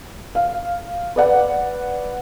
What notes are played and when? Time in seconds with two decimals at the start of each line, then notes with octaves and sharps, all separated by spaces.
0.35 F5
1.16 B4 D5 F#5